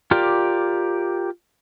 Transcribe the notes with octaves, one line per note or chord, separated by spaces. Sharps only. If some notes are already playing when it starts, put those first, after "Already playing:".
F4 G4 A#4 D5